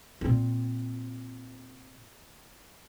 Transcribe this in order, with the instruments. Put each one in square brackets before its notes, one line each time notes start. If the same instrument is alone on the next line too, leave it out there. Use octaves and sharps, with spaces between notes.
[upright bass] A#2 C4